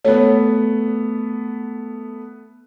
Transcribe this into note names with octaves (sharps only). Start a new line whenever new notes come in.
A3 B3 C#5